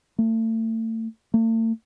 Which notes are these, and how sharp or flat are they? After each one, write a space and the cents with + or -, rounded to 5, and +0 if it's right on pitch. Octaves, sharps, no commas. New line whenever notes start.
A3 +35
A3 +45